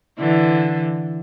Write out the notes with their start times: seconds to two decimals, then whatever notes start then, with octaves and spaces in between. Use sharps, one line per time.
0.19 D3 E3